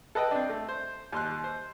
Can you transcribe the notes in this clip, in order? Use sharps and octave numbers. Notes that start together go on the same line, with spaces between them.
A4 B4 D#5 G5
C4 D4
A3
C5
D#2 C6 F#6
C5